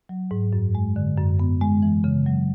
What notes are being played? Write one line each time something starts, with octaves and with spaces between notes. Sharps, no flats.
F#3
G#2
F#2
G#3
D3
F#2
B3
G#3
E3
C#3
F#3